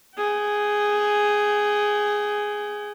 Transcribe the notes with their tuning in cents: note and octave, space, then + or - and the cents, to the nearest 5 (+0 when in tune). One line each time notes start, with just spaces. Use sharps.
G#4 +0 G5 -45